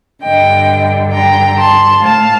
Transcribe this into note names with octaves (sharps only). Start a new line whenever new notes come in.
G2 D3 D#5 G5
G5 A#5
A5 C6
A2 F5 A5